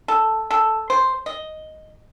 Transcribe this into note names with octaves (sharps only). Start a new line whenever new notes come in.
A4
A4
C5
D#5